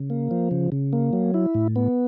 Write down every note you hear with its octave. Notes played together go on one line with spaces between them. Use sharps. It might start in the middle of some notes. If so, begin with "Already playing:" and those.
Already playing: C#3
A#3
F3
C#3
C#3
A#3
F#3
E4
A2
B3